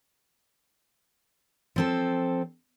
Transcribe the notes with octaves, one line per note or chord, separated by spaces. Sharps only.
F3 C4 A4